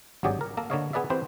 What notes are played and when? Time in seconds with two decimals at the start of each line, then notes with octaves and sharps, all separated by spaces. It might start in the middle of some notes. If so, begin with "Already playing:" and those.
0.23 G#1 G2 F#3 G4 G#4 D5
0.41 A#4
0.57 A#3 A4 A#5
0.70 D3 A#3 B4 C#5 D#5 F5
0.93 B3 G#4 B4 D5 E5
1.10 E3 C4 G4 B4 C5